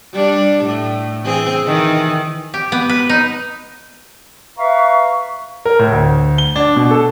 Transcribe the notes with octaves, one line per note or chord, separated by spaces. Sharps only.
G3 D4
A2
E3 C4 G#4
D#3 E3
G4
B3
B4
D#4
B4 E5 F5 A#5 C#6
A#4
A2
D2
G7
D4
B2
A4